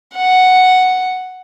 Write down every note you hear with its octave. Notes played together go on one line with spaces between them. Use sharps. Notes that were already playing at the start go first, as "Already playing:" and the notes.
F#5